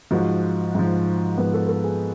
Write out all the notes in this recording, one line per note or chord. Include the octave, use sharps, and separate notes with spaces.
G#2 F3 F#4
G#2 F3
G#2 F3 B3
A4
A4
G#4